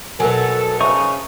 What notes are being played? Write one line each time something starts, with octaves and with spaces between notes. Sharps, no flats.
B2 F#3 A4 A#4 G#5
C#3 D#4 C5 E5 C#6